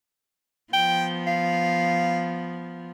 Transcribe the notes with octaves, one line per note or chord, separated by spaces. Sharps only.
F3 B3 G5
F5